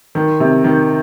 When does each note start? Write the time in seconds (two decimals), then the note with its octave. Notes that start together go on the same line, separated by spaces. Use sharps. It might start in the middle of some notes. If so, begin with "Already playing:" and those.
0.15 D#3
0.40 C3
0.64 D#3